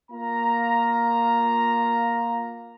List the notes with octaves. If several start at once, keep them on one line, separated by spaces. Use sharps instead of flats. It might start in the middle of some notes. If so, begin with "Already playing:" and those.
A#3 F4 A#5